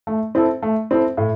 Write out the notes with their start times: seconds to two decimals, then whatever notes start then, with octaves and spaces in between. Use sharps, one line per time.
0.07 A3
0.35 C4 E4 A4
0.63 A3
0.91 C4 E4 A4
1.17 A2